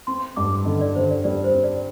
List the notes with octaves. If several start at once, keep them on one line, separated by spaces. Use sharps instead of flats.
C4 C6
G2 D6
D3 D#5
D5
D3 C5
D5
G3 D5
C5
C4
D5